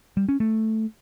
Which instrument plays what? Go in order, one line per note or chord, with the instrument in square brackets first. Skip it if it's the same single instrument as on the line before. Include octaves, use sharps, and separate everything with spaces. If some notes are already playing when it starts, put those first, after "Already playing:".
[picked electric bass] G3
C#4
A3